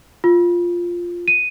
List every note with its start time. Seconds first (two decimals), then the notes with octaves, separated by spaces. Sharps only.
0.24 F4
1.28 D#7